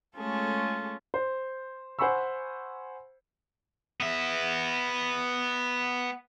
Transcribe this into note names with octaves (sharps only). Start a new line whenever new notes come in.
G#3 A3 C#4 F4 G#4 A4
C5
C5 F#5 G#5 B5 C#6 E6
B3 E5